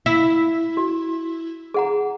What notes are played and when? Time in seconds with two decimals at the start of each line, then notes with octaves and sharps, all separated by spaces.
0.06 E4
0.77 F#4
1.74 G#4 F#5 A#5